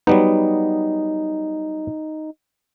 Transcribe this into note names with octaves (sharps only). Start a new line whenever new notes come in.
F#3 G3 B3 D#4